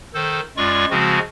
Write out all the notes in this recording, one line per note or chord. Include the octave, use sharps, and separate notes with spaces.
D#3 A4 C5
F#2 G#3 F4 D5 C#6
C#3 F3 G#3 C4 F#4